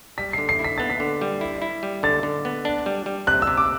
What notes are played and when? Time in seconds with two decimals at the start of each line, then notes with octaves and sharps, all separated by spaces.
0.18 G3 B6
0.33 C7
0.38 D3
0.49 C7
0.59 E4
0.64 B6
0.78 B3 A6
0.90 B6
1.00 D3
1.21 G3
1.41 E4
1.62 E4
1.83 G3
2.03 D3 A6
2.23 D3
2.45 B3
2.65 D4
2.86 G3
3.06 G3
3.27 C3 F#6
3.42 E6
3.47 C3
3.57 D6